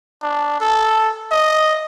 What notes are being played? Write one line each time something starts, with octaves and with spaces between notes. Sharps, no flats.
D4
A4
D#5